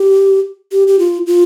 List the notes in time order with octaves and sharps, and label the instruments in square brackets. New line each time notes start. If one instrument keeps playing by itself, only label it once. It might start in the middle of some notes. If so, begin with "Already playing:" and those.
Already playing: [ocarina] G4
G4
G4
F4
F4